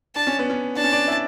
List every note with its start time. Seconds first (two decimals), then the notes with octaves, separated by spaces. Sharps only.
0.16 D4 A5
0.27 C#4
0.39 B3
0.50 C#4
0.77 D4 A5
0.84 C#4
0.92 D4
1.08 E4